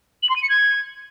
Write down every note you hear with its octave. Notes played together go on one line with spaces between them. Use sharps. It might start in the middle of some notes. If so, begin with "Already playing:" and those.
F#7
C6
D#7
C#7
G#6